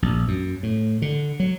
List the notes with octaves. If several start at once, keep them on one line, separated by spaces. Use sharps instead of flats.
A#1
F#2
A2
D3
F#3